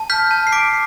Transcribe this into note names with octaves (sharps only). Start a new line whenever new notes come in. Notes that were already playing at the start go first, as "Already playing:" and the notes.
Already playing: A5
F6 G6 B6
A5
C7
D6 B6 D7